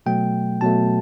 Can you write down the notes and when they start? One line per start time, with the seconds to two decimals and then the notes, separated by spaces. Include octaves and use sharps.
0.06 B2 F#3 A3 G5
0.61 B2 F#3 A3 A5